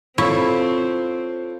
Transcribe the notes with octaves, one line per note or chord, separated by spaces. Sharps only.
C4 E4 F4 A4 C#5 C#6